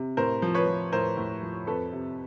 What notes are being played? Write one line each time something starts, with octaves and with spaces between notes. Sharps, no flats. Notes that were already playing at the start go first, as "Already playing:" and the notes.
Already playing: C3
A2 A#4 C5
F3
B4 C#5
F3
A2 A#4 C5
A2
F3
F2 A4 B4
C3